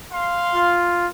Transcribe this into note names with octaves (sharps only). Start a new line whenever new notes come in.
F5 C6
F4